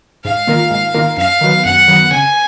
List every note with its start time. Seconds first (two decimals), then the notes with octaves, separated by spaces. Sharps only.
0.25 G#2 F5
0.47 D#3 A#3 F4 A#4
0.70 G#2
0.94 D#3 A#3 F4 A#4
1.17 F#2 F5
1.41 D#3 F#3 B3
1.65 F#2 F#5
1.88 D#3 F#3 B3
2.11 C#3 G#5